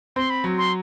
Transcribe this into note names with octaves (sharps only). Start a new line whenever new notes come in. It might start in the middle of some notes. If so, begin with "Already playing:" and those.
C4 C6
B5
F#3
C6